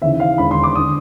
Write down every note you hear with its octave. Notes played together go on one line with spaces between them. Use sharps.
D#2 C#3 E3 E5
F5
E1 D#2 D3 B5
C6
D6
D#6
D3